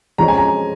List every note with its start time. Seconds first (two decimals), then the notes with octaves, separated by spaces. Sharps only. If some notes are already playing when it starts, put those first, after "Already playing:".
0.18 F2 F3 G#3 C#4 A#5
0.28 G#5
0.37 A#5